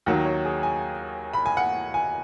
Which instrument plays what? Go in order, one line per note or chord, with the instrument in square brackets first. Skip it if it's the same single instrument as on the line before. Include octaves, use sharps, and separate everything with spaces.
[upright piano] D#2 D#3 F#3 F#5
C#5
G#4
G#5
B5
G#5
F#5
G#5